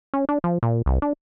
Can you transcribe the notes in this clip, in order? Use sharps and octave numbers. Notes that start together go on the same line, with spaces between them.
C#4
D4
F3
A#2
C2
D4